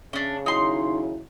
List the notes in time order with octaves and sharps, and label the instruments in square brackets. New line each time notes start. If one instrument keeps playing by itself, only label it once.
[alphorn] C#3 [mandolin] C#4 D4
[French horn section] D#2 F#3 E4 [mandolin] D#4 C6